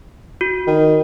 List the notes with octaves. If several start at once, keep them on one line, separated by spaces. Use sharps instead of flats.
F#4
D#3